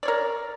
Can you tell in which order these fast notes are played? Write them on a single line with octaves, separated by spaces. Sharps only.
D5 C#5 A#4